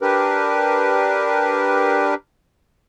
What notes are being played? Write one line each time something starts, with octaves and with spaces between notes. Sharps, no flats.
D4 G4 A#4 B4